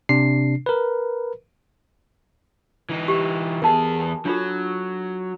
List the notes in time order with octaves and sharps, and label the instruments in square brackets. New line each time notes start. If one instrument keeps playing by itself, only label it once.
[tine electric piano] C3 D4 C7
A#4 B4
[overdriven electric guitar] E3 D#4
[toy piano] G4 C#6
[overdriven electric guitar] E2 G#4 [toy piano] A#4 A5
[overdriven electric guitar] F#3 [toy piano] D4 F4 A4